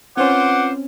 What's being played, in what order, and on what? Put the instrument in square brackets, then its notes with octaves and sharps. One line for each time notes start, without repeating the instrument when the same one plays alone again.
[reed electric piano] C4 C#4 [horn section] F4 B4 C5 [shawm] F#5 [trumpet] D6